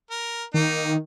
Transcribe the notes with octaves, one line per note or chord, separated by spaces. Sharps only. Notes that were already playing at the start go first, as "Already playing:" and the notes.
A#4
D#3 A#3 D#4